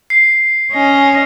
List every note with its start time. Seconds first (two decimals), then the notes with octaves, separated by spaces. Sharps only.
0.10 C7
0.72 C#4 D#5